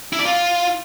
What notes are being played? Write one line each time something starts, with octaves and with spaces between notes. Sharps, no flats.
E4
D5
F4